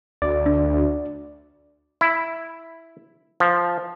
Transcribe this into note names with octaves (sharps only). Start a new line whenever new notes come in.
D2 D5
D4
E4
F3